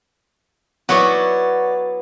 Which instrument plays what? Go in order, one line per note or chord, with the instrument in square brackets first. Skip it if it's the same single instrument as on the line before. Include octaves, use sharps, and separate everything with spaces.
[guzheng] F#3 B3 E4 [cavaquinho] F#4 C#5 D5